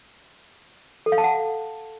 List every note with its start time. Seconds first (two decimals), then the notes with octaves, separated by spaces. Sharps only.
1.06 A4
1.12 F5
1.18 A5
1.24 F#5